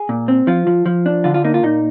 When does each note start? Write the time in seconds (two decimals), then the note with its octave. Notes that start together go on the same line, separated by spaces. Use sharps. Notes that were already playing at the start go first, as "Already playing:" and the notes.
Already playing: G#4
0.09 A#2
0.28 C4
0.47 F3 F4
0.67 F3
0.86 F3
1.06 D4
1.24 D3 F4
1.34 F4
1.44 A#3 D#4
1.54 F4
1.63 A#2 D#4